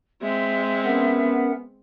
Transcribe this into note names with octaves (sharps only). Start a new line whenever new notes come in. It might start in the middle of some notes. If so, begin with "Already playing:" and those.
G#3 C4 E5
B3 C#4 A#4 F#5